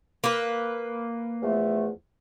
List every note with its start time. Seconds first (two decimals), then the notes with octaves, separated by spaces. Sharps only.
0.24 A#3 B4
1.43 E2 F3 A3